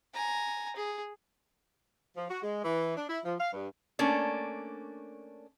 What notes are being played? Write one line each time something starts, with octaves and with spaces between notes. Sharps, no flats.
G#5 A#5
G#4
F3
F#4
G#3
E3
D4
E4
F3
F5
G2
A3 A#3 C#4 D4